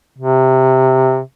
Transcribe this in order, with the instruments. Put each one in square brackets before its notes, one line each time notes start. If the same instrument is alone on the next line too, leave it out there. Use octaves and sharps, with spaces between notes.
[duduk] C3